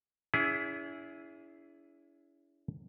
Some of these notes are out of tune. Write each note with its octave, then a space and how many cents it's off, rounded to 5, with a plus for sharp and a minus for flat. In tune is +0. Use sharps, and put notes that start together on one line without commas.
C#4 +45 E4 +0 G#4 +0